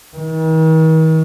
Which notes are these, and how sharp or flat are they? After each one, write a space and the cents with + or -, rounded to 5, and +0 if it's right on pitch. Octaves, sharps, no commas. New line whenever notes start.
D#3 +45